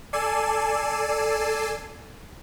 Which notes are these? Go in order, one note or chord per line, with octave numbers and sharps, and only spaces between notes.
A4 D5 G#5 C7 D#7 E7